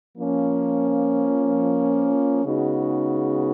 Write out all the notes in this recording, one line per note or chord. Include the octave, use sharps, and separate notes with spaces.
F3 A#3 C#4
C#3 G#3 B3 D#4 F#4